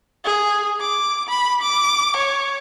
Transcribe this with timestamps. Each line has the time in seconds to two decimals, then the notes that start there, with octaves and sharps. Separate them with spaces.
0.24 G#4
0.80 D6
1.29 B5
1.62 D6
2.16 C#5